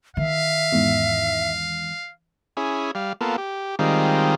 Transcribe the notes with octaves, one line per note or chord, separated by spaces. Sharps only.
D#3 E5 F5
E2 G#2
C#4 E4 G#4
G3 F5
A#3 B3 F4 A4
G4
D#3 G3 G#3 C4 F4